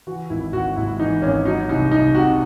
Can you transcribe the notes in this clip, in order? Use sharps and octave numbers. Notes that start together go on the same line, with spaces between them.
E3 F#4
G#1 E4
G#1 F#4
G#2 E4
E3 D#4
G#1 C#4
F#3 D#4
C2 D#4
C2 D#4
C3 F#4